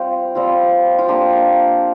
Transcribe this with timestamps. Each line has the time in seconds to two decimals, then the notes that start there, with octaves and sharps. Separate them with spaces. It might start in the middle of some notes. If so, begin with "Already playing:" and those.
Already playing: G3 C4 F4
0.35 G3 C4 F4
0.98 F4
1.08 A#3 D4 F4 G4